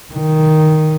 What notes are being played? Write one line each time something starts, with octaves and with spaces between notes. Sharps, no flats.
D#3